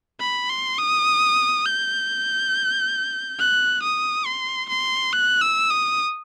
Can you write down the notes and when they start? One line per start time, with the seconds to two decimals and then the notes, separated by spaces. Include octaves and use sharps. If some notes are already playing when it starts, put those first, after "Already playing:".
0.21 B5
0.50 C6
0.79 D#6
1.65 G6
3.39 F#6
3.82 D#6
4.26 C6
4.69 C6
5.13 F#6
5.41 E6
5.70 D#6